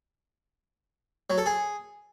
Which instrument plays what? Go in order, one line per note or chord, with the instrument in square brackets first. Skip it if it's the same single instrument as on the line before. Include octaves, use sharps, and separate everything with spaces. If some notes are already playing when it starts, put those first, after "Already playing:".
[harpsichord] F#3
A4
G#4